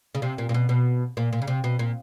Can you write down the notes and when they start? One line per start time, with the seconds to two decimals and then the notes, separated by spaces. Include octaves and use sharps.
0.15 C#3
0.22 C3
0.38 A#2
0.49 A#2
0.54 B2
0.69 B2
1.17 A#2
1.33 A#2
1.42 C#3
1.47 C3
1.64 B2
1.79 A#2